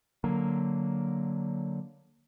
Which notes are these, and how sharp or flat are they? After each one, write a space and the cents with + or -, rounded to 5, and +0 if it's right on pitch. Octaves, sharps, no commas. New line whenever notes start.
D3 +0 F#3 +0 A#3 +0